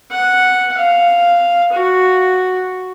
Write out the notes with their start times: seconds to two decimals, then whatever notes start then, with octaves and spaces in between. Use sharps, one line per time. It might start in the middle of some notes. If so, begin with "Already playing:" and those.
0.12 F#5
0.78 F5
1.73 F#4